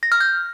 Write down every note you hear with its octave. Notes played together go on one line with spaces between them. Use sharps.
A#6
F6
G6